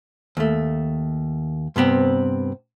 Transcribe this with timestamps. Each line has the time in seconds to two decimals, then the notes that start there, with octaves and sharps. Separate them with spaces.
0.37 D#2 A3
1.76 G2 C3 B3 C4